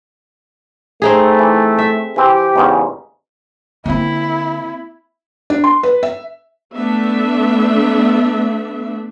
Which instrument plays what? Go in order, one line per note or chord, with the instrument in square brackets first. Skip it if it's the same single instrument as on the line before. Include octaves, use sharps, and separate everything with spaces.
[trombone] A3 [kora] C4 D#4 G#4
[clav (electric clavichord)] E3
[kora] E5
[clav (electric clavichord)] E3 C4 [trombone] G4
[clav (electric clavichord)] E2 G#2 C#3
[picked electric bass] D3 [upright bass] A#3 C4 [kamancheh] E4
[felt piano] D4
C6
B4
E5
[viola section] A3 B3 D4 E5